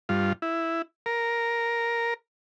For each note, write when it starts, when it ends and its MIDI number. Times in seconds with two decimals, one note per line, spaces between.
0.09 0.33 43
0.09 0.33 65
0.42 0.82 64
1.06 2.14 70